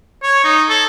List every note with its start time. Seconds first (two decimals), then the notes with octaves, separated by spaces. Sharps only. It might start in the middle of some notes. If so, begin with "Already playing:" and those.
0.23 C#5
0.44 D#4
0.69 A4